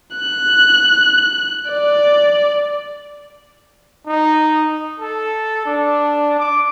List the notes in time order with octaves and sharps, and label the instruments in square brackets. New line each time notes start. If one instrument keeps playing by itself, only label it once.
[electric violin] F#6
D5
[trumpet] D#4
A4
D4
D6